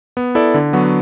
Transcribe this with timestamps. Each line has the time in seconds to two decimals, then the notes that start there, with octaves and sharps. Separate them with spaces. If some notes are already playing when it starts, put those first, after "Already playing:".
0.17 B3
0.35 E4 A4 D5
0.54 D3
0.73 F#3 B3 F#4